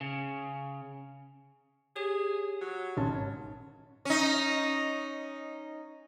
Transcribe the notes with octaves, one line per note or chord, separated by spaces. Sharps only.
C#3
G4 G#4 C#5
F#3
G#1 C#4 A5
C#4 D#4